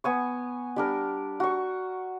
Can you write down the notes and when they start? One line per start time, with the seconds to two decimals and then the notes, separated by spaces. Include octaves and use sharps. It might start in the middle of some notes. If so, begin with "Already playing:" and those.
0.04 B3 G#5 C#6
0.76 G3 D4 A#4
1.40 F#4 C#6